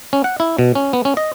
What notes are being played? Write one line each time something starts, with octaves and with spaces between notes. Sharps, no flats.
C#4
F#5
E4
B2
C#4
B3
C#4
D#5